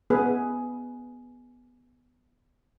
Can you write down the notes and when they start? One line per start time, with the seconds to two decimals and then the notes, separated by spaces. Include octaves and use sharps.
0.10 B3 G#4 B4